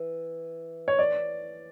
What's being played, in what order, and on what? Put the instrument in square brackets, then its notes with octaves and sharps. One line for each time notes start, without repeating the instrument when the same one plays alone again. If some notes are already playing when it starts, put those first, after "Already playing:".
Already playing: [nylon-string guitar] E3
[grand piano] C#5
D5